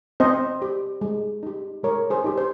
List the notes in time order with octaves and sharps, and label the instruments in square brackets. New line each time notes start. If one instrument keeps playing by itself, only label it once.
[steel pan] C4 C5 D#5
G4
G#3
D#4 G4
G#3 A#4 C#5
G#4 C5
D#4 G4
C5